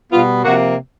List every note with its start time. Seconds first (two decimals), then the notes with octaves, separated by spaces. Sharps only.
0.12 B2 G3 B3 F4
0.44 C3 F3 A#3 F#4